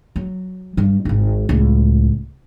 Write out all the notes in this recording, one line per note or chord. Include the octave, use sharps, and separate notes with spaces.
F#3
G2 G3
G#1 D#4
C#2 A2